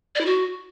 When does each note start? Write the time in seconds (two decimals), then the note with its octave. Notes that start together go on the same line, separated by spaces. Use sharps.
0.15 D5
0.21 E4
0.26 F#4